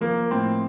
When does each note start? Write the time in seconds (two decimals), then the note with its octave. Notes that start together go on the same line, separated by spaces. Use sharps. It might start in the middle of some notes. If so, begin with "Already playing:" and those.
0.01 F3 A#3
0.31 A2 C4